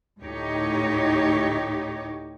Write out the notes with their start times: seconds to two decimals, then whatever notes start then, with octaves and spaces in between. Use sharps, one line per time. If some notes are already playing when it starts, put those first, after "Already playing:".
0.22 D2 A2 D#4 G4 C#5